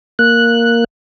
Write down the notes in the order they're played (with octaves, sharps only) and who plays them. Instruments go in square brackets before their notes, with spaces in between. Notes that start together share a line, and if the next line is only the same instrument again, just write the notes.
[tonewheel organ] A#3 F#6